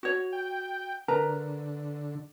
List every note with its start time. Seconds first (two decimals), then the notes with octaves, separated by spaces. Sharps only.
0.03 F#4 C#5
0.33 G5
1.08 D3 A#4 B4 A#5